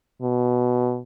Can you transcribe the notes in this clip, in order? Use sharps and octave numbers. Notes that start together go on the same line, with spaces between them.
B2